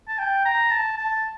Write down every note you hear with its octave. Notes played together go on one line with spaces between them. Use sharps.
A5
G5
A#5
A5
A5